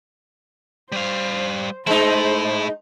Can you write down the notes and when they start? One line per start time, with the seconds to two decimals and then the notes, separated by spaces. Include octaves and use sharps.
0.92 G3 C5 F5
1.87 G#3 A3 D#4 E4 C5